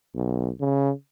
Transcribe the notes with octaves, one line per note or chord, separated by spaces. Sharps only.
B1
C#3